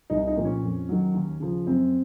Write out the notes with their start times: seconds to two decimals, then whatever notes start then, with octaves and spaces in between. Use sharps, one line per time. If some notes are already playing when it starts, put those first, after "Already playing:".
0.10 C2 D#4
0.27 D#4
0.36 A#2 F3 A#3
0.45 C#4
0.63 F2
0.89 D#3 F#3
1.14 D#2
1.40 C#3 F3
1.66 F#2 C4